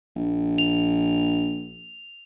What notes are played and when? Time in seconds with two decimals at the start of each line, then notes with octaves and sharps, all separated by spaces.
0.16 A#1
0.58 F7